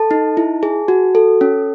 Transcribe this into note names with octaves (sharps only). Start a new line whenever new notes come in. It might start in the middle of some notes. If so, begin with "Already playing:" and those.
Already playing: A4 A5
D#4
E4
G#4
F#4
A4
C#4